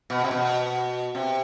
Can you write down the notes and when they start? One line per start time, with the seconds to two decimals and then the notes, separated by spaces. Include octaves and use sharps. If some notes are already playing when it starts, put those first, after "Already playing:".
0.10 B2
0.24 C3
0.31 B2
1.15 C3